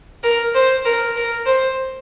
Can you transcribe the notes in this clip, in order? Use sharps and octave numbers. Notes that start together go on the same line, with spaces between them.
A#4
C5
A#4
A#4
C5